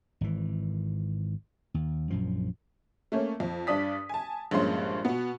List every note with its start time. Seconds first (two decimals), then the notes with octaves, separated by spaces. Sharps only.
0.21 G#1 E3
1.74 D#2
2.10 A#1 F#2 F3
3.12 A3 A#3 C#4
3.40 F2
3.67 G2 D4 D5 D#6 B6
4.09 G#5 A5
4.51 A#1 G2 G#3 A#3 C#4 C6
5.05 B2 B3